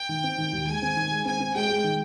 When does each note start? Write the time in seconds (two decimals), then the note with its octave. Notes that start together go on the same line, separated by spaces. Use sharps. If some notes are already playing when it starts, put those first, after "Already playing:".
Already playing: G5
0.09 D#3
0.23 C4
0.38 D#3
0.53 D#2
0.67 G#3 G#5
0.82 C4
0.96 D#3
1.11 G#3
1.25 C4 G#5
1.40 C4
1.55 G#3 G5
1.70 G#3
1.84 D#3